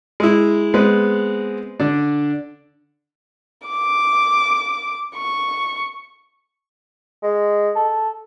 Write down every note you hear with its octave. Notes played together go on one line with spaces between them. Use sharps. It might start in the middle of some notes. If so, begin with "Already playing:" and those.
G#3 E4
G#3 B3 C4 B4
D3 D4
D6
C#6
G#3
A4